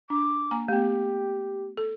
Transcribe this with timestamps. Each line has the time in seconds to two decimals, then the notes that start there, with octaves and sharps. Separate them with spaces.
0.10 D4 D6
0.51 A#3 G#5 A#5
0.68 A3 B3 G4
1.77 A4